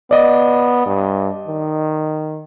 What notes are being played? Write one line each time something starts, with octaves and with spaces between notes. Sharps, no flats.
B3 D5 D#5
G2
D#3